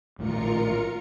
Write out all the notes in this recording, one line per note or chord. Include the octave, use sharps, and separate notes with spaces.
A#1 A2 D#3 F4 A#4 C#7